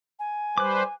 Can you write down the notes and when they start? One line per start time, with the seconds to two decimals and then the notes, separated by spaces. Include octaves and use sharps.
0.19 G#5
0.58 G3 B4 C5 D6 F#6